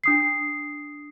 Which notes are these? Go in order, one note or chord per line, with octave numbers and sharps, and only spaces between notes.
D4 D#6 C7